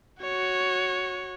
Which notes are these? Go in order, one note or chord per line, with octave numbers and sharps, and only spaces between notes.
F#4 C#5